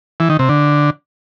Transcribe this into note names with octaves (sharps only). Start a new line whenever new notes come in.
E3
D#3
C3
D3